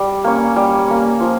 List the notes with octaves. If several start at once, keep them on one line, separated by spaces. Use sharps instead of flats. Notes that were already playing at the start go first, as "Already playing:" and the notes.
Already playing: G3
A#3 C#4
G3
A#3 C#4
F3